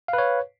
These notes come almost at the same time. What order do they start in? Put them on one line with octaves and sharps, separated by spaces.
F5 B4 C#5